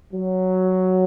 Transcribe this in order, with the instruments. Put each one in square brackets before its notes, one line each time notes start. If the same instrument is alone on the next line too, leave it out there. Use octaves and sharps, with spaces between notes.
[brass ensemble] F#3